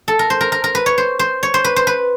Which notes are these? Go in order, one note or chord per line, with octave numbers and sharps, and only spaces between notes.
A4
A#4
C5
A#4
A#4
A#4
B4
C#5
C5
C5
C#5
C5
B4
C5
B4